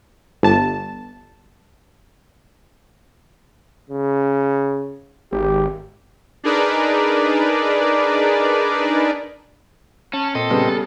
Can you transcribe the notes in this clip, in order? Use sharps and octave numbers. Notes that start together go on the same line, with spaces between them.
G1 A5
C#3
G#1 G4
D4 D#4 G#4 A#4 B4 D5
C#4 A5
A#2 C4 A4 D#5
C#3 G3 B3